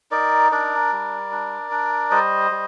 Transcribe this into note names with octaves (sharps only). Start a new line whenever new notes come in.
D#4 A#4 D5
D4 A#4 D5
G3
D4
D4
G3 C5 D#5
G3